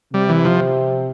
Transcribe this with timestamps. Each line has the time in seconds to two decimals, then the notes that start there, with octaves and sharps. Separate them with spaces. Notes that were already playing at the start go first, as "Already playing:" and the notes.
0.14 C3 G3
0.29 E3
0.45 F3